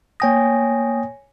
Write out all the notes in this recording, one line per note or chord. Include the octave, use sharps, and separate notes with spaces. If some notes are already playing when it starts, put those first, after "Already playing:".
A#3 C#5 G5 G#5 D#6 A#6